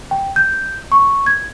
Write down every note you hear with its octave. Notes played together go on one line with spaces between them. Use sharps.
G5
G6
C#6
G#6